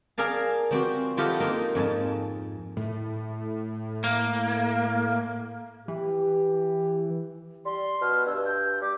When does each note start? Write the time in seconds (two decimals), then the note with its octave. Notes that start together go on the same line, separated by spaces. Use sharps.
0.18 G#4 A#4 D5 F5 A5
0.71 F3 C4 F#4 G4
1.17 E4 F4 G4 A4 D#5 F#5
1.40 A#3 D#4 F4 G4
1.75 F2 G#2 A5
2.77 A2
4.04 A#3
5.88 E3 G4
7.65 G3 C6
8.02 B2 F6
8.27 G2 E6
8.45 G6
8.82 G3 D6